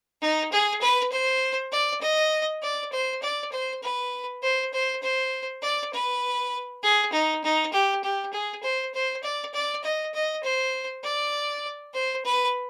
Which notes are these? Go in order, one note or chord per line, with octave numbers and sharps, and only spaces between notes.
D#4
G#4
B4
C5
D5
D#5
D5
C5
D5
C5
B4
C5
C5
C5
D5
B4
G#4
D#4
D#4
G4
G4
G#4
C5
C5
D5
D5
D#5
D#5
C5
D5
C5
B4